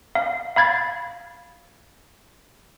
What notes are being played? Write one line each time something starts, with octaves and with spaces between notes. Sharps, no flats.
F5
F5 B5 G#6 A6